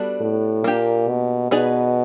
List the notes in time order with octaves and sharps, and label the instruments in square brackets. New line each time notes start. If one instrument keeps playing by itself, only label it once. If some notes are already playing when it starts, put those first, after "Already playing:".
Already playing: [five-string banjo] G3 B3 D4 F#4 A4
[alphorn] A2
[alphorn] A#2 [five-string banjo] A#3 D4 G4
[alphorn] B2
[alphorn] B2 [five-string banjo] B3 D#4 G#4 B4 D5